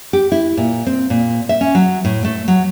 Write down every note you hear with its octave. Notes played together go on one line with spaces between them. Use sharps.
G4
E4
A#2
C4
A#2
E5
C#4
F#3
A2
A3
F#3